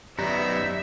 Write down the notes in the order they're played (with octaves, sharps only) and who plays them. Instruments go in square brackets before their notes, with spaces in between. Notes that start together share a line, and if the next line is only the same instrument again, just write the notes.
[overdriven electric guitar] F#2 B3 [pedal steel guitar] D#4 [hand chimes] G4 D5 A#5 [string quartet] E5